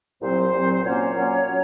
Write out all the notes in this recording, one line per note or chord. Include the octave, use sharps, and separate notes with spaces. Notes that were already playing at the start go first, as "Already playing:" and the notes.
C2 A#2 F#3 C4 C5
C2 A#2 F#3 C4
C5
A#2 F#3 A#3 C#4 C#5
A#2 F#3 A#3 C#4
F#3 C#4